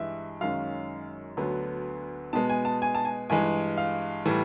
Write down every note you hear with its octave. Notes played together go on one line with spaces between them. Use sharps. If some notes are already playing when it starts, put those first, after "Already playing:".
Already playing: G2 E3 G#3 E5
F#2 D#3 G#3 C#4 F5
D2 D3 F#3 B3
B2 G#3 B3 A5
G#5
A5
G#5
A5
G#5
G2 E3 G#3 G#5
F5
A2 E3 G3